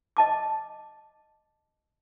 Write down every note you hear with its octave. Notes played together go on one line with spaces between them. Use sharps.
D#5 A5 D6